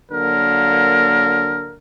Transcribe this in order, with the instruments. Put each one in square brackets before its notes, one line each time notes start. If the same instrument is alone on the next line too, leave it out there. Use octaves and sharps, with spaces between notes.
[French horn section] D3 F#3 A#3 [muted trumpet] A#4